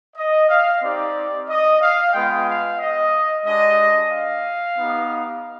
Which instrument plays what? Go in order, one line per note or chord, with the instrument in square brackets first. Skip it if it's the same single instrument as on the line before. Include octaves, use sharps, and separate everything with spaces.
[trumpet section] D#5
F5
C4 D#4 G4 D5
D#5
F5
G#3 B3 F4 G5
F5
D#5
G#3 D4 G4 D#5
F5
B3 D#4 G4